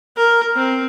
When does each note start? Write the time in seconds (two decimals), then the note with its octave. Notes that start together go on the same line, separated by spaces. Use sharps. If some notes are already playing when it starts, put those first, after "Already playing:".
0.17 A#4
0.56 C4